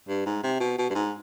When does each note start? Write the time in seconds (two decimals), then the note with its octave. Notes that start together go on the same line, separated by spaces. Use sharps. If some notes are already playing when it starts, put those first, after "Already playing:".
0.08 G2
0.26 G#2
0.43 C3
0.60 B2
0.78 B2
0.90 G2
0.95 G#2